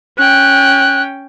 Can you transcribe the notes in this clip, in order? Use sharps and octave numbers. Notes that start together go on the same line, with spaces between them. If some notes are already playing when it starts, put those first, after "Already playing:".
C#4 G5 F#6